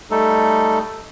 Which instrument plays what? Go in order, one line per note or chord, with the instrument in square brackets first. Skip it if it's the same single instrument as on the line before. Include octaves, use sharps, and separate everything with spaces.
[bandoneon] G3 A3 D#4 A4